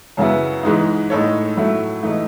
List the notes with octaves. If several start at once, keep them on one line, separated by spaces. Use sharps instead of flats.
F#2 C#3 F#3 B3 E4
G#2 E3 G#3 D#4
A2 G#3 D#4 A4 C#5
A2 F#3 A3 E4
G#2 E3 A3 D#4